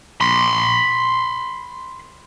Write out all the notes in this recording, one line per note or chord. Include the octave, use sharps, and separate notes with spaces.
B5 C6